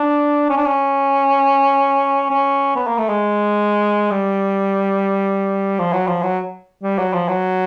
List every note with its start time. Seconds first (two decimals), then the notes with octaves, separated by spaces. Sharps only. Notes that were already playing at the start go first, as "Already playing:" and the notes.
Already playing: D4
0.50 C#4
0.57 D4
0.66 C#4
2.31 C#4
2.76 B3
2.87 A#3
2.98 A3
3.09 G#3
4.11 G3
5.79 F3
5.93 F#3
6.07 F3
6.23 F#3
6.83 G3
6.98 F#3
7.13 F3
7.28 F#3